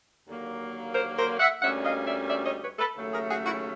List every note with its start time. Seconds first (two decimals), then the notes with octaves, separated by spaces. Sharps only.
0.28 D#2 D3 F#3 A#3
0.94 A#4 C5
1.17 A#4 C5
1.40 E5 F#5
1.61 D2 D3 G3 A#3 C#4 E5 F#5
1.84 D#5 F5
2.06 D5 E5
2.29 D5 E5
2.45 C#5 D#5
2.62 B4 C#5
2.79 A4 B4
2.96 D#2 C#3 F#3 A3 C#4
3.12 G#4 A#4
3.29 F#4 G#4
3.46 E4 F#4